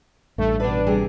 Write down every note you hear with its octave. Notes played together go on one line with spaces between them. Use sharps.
A1 G2 A3
B2 D4 B4
C3 G3 G#4